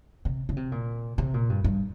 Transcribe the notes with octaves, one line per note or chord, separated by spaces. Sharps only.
C3
C#3
C3
A#2
C3
A#2
G2
G2